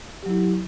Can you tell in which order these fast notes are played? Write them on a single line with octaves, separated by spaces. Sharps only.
G4 F#3 E4